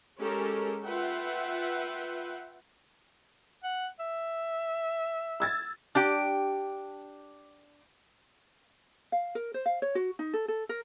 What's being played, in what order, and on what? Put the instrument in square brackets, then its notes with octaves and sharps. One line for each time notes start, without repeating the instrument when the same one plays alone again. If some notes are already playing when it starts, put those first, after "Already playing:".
[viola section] G#3 C#4 G4 A4 A#4
F4 B4 E5 F#5 G5
[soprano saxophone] F#5
E5
[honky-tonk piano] E6 G#6 A6
[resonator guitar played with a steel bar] D4 G4 G5
[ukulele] F5
A#4
C5
F5
C#5
F#4
D#4
A4
A4
A#4